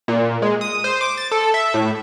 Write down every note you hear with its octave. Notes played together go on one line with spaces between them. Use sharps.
A#2
G#3
D#6
C5
D6
A6
A4
E5
A2